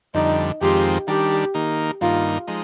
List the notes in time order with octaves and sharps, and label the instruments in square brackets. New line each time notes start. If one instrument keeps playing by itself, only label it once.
[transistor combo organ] F2 D3 G3 [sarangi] D#4
[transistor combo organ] F2 D#3 G#3 C4 F4 [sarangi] G4
[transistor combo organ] D#3 G3 D4 [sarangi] G4
[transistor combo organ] D#3 A#3 D#4
[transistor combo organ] G2 D#3 A#3 D#4 [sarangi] F4
[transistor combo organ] F3 G#3 D#4